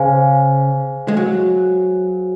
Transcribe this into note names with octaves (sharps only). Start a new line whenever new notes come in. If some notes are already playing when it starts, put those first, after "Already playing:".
Already playing: C#3 G#4 C5 F5 G#5
G#3
F#3